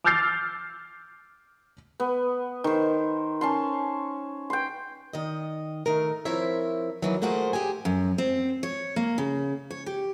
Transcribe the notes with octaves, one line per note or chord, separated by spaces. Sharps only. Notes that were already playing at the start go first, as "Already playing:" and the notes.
D6 E6 F6 G6 A6 C7
B3
D#3 C5
C#4 A5 C6
G5 C6
D#3 D#5
D#3 A3 A#4
F3 C4 E4 A#4 C#5 E5
D#3 E3 F#3
F3 A3 A#3 F#4 G#4 C5
G4 G#4 G#5
F#2
C4
C#5
A#3
C#3
C#5
G4